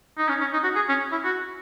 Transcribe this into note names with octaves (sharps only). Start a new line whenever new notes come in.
D#4
C#4
C#4
D#4
F#4
G#4
C#4
E4
F#4